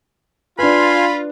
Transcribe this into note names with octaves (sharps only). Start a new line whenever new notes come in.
D4 F4 B4 F5 G#5 B5 C6